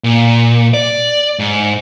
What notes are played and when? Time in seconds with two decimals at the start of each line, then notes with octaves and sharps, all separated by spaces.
0.04 A#2
0.74 D5
1.39 G#2